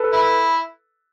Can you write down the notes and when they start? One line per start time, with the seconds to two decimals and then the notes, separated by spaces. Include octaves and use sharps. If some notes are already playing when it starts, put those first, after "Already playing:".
Already playing: A4 B4
0.12 E4